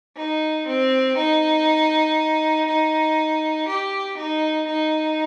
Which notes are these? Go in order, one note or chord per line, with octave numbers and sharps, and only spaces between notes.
D#4
C4
D#4
D#4
G4
D#4
D#4